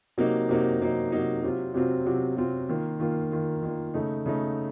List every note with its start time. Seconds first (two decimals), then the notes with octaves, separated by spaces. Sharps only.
0.18 C3 F#3 A#3 D#4
0.49 C3 F#3 A#3 D#4
0.80 C3 F#3 A#3 D#4
1.12 C3 F#3 A#3 D#4
1.43 C3 F#3 C4 F4
1.74 C3 F#3 C4 F4
2.06 C3 F#3 C4 F4
2.37 C3 F#3 C4 F4
2.69 D#3 A#3 F4
3.00 D#3 A#3 F4
3.31 D#3 A#3 F4
3.63 D#3 A#3 F4
3.94 C#3 A3 D#4
4.26 C#3 A3 D#4